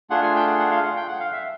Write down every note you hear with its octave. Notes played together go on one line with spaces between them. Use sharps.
A3 D4 F4 G#4 F#5
G#5
G5
F#5
F#5
F5
F#5
G5
F#5
F5
E5